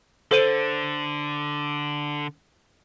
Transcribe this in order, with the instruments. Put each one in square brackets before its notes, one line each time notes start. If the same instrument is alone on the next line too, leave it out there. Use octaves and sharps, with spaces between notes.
[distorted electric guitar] D3 [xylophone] A4 C5 D#7